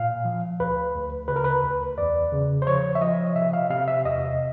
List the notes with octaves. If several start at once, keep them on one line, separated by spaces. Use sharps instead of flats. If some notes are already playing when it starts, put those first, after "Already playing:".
Already playing: A#2 F5
F3
D2 B4
D2
C#3 B4
A#4
B4
D2
E2 D5
C#3
C5
F3 C#5
E5
F3 D#5
C3 E5
F5
C3 F5
E5
E2 D#5